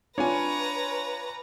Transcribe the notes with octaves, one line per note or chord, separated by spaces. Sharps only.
D4 F4 B4 C#5 G#5 A#5